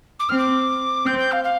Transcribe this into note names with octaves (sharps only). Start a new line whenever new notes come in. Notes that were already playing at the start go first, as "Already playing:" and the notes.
D6
C4 F6
D6
C4 G6
G6
F5
F5